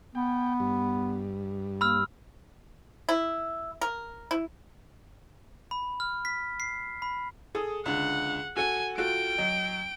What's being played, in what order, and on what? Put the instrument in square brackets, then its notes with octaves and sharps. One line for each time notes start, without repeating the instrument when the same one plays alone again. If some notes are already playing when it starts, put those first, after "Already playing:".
[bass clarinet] B3 [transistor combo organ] G5
[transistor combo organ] G2
[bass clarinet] A#3 [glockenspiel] B5 E6 F6
[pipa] E4
A#4
E4
[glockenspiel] B5
F6
B6
C7
B5
[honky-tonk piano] G#4 A4 D#6
[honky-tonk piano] C#2 D3 [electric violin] F#5
[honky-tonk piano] F#4 A4 F#5 [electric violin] G#5
[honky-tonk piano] F4 F#4 A4 [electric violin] G5 D7
[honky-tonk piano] F#3 D#5